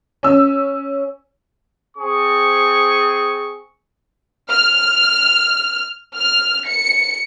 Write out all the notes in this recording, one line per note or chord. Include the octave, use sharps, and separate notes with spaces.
C#4 E6
C4 G#4 C#6
F6
F6
C#7